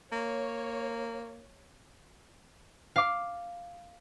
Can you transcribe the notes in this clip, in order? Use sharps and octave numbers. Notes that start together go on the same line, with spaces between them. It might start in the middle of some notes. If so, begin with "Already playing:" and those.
A#3 C#5
F5 D6